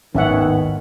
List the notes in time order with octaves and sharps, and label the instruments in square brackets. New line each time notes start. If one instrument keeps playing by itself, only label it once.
[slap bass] G#1 D#2 A2 [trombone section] D#3 B3 [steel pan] C#4 E5 F#5